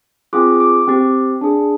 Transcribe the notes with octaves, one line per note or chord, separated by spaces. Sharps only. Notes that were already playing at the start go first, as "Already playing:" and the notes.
C4 F4 G#4 D6
D6
C4 G4
D4 G#4